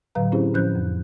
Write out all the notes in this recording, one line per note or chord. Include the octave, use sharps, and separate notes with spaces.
A2 D3 F#3 B4 F5 A#5
C4 C#4 E4 G4 G#4 C5
A2 F3 C#4 C5 F#6 G6
F2